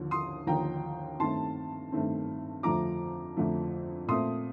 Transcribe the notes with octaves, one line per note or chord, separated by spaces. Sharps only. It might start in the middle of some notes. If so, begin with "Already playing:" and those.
Already playing: D#2 D3 F3
C6 D#6
D#2 D3 F3 G5 A#5
G2 D#3 A3 C4 A5 C6
G2 D#3 A3 C4
F2 D3 F3 A3 A#5 D6
F2 D3 F3 A3
A#2 A3 C4 C6 D#6